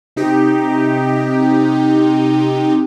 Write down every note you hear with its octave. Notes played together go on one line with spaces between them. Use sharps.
C3 D#4 G4